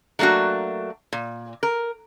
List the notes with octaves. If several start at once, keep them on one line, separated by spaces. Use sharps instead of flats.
F#3 A3 A#3 D4 F#4
A#2
A#4